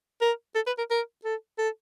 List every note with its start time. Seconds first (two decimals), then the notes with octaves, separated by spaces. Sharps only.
0.22 A#4
0.55 A4
0.67 B4
0.78 A#4
0.91 A#4
1.25 A4
1.58 A4